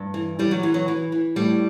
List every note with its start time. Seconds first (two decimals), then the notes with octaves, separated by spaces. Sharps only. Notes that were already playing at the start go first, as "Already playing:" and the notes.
Already playing: G2
0.14 E3
0.39 E3 G3
0.51 F#3
0.63 E3
0.74 F#3
0.88 E3
1.12 E3
1.36 A2 G3